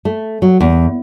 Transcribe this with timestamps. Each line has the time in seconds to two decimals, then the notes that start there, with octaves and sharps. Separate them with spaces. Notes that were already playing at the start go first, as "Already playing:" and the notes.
0.05 A3
0.42 F#3
0.61 E2